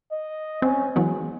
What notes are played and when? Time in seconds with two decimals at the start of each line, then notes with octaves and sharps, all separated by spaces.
0.12 D#5
0.62 C4 C#4
0.96 E3 F#3 G#3 B3